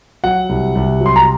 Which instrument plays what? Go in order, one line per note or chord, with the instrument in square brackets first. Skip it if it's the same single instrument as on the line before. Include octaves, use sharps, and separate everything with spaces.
[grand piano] F#3 F#5
C2
C2
F#3
C6
A#5